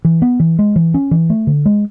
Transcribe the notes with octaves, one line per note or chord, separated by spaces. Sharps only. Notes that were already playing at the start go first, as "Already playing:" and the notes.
E3
B3
E3
G#3
E3
C#4
E3
A3
D3
G#3